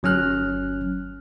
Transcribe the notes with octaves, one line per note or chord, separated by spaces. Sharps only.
G1 F#3 C#4 F6 F#6